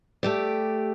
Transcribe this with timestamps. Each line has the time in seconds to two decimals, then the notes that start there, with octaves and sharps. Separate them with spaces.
0.23 A3 G4 D5